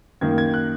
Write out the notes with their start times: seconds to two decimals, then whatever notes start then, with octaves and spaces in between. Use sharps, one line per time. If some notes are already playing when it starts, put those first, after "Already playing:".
0.21 F#2 D#3 A#3 G#6
0.38 G#6
0.54 F#6